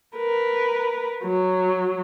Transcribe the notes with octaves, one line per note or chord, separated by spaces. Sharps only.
A#4 B4
F#3